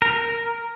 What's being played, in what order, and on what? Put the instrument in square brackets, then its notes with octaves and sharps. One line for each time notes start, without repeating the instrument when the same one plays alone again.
[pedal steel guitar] A#4